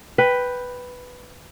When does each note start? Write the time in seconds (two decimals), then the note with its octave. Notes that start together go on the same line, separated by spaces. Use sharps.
0.18 B4 G5